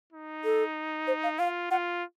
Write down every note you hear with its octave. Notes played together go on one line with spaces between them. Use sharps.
D#4
A4
C5
F5
F4 F5
F4 F#5